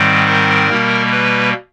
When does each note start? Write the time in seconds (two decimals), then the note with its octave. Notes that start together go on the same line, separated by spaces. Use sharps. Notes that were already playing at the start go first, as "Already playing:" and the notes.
Already playing: G#2 D#3 G3 C4
0.27 A#4
0.69 B2 G3 A#3
1.12 B4